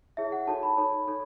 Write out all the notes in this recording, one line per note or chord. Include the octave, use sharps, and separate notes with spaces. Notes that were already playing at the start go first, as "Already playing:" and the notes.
E4 G#4 C#5 E5
F#5
D#4 F#4 A4 C#5 A5
B5
D#4 A4 C#5
D#4 A4 C#5